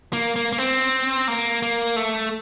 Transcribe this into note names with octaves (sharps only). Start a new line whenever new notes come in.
A#3
A#3
A#3
C4
A#3
A#3
A3